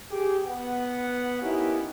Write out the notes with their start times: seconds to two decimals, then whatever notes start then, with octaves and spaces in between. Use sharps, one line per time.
0.11 G4 G#4
0.45 B3 F#5
1.41 A#3 B3 C#4 D#4 E4 G4